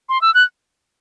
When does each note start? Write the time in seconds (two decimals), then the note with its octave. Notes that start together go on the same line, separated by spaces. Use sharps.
0.09 C6
0.22 E6
0.34 F#6